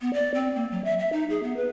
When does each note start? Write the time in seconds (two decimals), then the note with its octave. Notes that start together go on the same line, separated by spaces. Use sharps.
0.01 B3
0.14 D5
0.34 C4
0.56 A#3
0.71 F#3
0.84 E5
0.99 E5
1.13 D#4
1.30 G#4
1.43 B3
1.56 B4